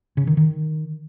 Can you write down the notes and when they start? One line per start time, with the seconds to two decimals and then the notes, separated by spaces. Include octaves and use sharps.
0.17 C#3
0.27 D#3
0.37 D#3